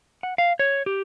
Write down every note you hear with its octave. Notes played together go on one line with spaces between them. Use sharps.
F#5
F5
C#5
G4